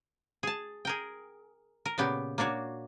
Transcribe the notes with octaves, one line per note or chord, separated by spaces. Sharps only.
G#4 A5
G#4 A#4 G5
A#4
A#2 C#3 B3 G4
A#3 D4 F#4 C#5